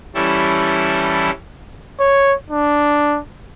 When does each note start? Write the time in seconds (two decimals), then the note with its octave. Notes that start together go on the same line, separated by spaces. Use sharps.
0.15 E3 G3 C#4 E4 A4
2.00 C#5
2.50 D4